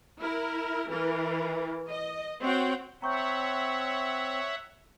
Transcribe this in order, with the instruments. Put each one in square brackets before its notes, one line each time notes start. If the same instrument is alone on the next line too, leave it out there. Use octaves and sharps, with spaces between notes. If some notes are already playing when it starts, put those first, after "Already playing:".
[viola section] E4 A#4
E3 A#4
D#5
C4 F#4 C#5 F#5 G5
[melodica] C4 [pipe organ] C#5 E5 F#5 [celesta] A#5 C#6 G6